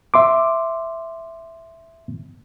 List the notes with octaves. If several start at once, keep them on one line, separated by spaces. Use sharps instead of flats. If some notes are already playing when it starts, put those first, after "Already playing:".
E5 C6 D6